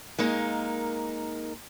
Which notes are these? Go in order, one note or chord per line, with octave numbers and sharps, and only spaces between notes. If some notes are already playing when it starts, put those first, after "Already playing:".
G#3 A#3 D#4 A#4